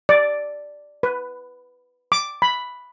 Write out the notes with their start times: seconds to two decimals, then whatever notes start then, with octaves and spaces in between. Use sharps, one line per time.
0.09 D5
1.03 B4
2.12 D6
2.42 B5